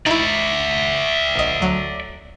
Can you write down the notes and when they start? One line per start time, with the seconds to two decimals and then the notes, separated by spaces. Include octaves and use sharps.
0.06 D#4 E4 D5 E5
1.35 A#1 D#5
1.60 D2 F#3